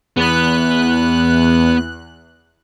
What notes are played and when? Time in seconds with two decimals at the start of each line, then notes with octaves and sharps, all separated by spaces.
0.17 E2 B3 B4 F#6